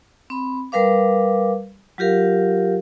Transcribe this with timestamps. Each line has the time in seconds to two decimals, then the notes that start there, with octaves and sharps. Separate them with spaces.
0.30 C4 B5
0.72 G3 A#4 B4 F5 D6
1.98 F#3 F4 G4 A#4 F5